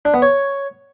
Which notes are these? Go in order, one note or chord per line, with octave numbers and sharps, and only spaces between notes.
D4
B3
C#5